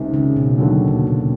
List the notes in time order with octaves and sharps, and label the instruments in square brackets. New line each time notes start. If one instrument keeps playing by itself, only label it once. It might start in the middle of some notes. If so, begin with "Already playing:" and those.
Already playing: [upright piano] C#2 C3 D#3
[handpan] C#3
B2
[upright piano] D#2 D3 F#3 [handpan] B2
[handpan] A#2
A#2
B2